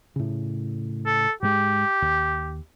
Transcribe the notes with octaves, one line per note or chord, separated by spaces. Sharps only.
A2 C#3
A4
G#2 G#3 G4
D#2